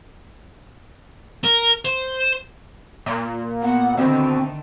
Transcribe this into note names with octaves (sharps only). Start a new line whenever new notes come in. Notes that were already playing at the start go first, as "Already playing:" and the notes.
A#4
C5
A#2
B3 F#5
B2 D3 D#3 A3 C4